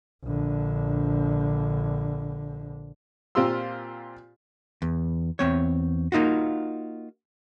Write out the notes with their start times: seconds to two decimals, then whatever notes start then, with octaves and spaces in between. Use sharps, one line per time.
0.24 A#1 D3
3.35 A#2 C4 F4 G4 C6 E6
4.82 E2
5.39 E2 C4 C#5
6.12 A#3 D#4 F4 F#4